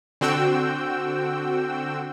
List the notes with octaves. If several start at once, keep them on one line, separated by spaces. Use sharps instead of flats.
D3 C4 F#4 G5 E6